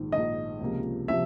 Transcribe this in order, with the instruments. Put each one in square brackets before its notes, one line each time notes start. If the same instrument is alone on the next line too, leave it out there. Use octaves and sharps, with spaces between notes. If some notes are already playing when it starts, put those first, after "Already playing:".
Already playing: [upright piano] A#1 G#2 D#3
[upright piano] A#1 G#2 D#3 [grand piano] D#5
[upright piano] C#2 C3 F3 A#3
[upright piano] C3 F3 [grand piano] E5